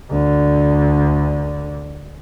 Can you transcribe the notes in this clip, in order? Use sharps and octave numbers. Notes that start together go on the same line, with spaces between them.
D2 D3